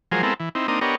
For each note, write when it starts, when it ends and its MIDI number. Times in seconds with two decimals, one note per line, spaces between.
0.12 0.22 53
0.12 0.22 54
0.12 0.22 56
0.12 0.22 68
0.12 0.22 70
0.12 0.22 72
0.23 0.34 56
0.23 0.34 59
0.23 0.34 60
0.23 0.34 64
0.23 0.34 69
0.23 0.34 70
0.40 0.49 52
0.55 0.67 60
0.55 0.67 63
0.55 0.67 64
0.68 0.79 58
0.68 0.79 60
0.68 0.79 62
0.68 0.79 63
0.68 0.79 87
0.81 0.95 59
0.81 0.95 62
0.81 0.95 67
0.81 0.95 70
0.81 0.95 73
0.81 0.95 75